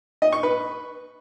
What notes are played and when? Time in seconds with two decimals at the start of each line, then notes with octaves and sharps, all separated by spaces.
0.22 D#5
0.33 C#6
0.43 B4